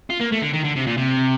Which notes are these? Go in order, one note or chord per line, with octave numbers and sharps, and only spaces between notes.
F4
A#3
A3
D3
D#3
D3
C3
A#2
C3